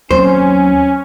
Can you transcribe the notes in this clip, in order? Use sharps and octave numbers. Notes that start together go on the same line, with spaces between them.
D#2 F#3 C4 C#4 C5